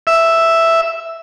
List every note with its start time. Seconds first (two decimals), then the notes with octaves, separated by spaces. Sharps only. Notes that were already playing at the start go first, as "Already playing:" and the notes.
0.07 E5